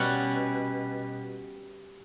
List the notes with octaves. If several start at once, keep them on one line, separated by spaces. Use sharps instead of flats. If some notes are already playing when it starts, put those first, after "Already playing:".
Already playing: B2 G3 C#4 F#5